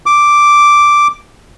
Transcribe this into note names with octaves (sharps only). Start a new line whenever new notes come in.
D6